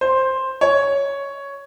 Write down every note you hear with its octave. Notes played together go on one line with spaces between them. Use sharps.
C5
C#5